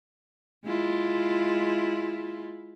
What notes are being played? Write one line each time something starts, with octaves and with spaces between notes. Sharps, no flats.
G#3 E4 F4